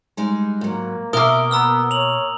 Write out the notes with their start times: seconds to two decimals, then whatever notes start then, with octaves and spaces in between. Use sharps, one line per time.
0.17 G3 G#3 D#4
0.61 G#2 F#3 A#3
1.13 B2 A#3 A#4 E5 D#6 G7
1.51 B3 A#5 E6 F6
1.91 C#5 F7 F#7